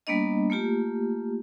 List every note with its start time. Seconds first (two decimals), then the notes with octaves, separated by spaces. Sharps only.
0.07 G3 A#3 B3 D4 D#5
0.50 A3 A#3 F4 G4